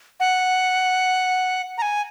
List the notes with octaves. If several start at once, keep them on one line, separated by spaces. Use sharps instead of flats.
F#5
A#5
G#5